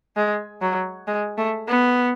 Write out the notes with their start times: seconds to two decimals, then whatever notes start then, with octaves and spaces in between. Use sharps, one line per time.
0.16 G#3
0.62 F#3
1.08 G#3
1.38 A3
1.68 B3